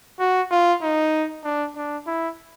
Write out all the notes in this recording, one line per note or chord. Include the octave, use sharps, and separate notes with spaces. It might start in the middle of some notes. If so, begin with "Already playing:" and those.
F#4
F4
D#4
D4
D4
E4